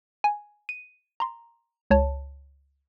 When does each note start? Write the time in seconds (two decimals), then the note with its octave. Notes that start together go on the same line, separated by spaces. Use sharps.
0.24 G#5
0.69 D#7
1.20 A#5 C6
1.91 C#2 C#5 A5